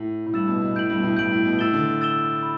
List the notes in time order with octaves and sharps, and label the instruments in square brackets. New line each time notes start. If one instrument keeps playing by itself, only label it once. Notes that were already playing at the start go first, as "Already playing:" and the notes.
Already playing: [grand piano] A2
A2
[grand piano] G2 [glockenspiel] E6 A6 E7
[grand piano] B2
B2
[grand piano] A2 [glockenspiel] G6 D7 F#7
[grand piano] G2
B2
A2
[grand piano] G2 [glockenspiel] G6 D7 F#7
[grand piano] A2
B2
[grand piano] A2 [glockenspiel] E6 A6 E7 G7
[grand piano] D3
[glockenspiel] E6 A6 E7 G7
B5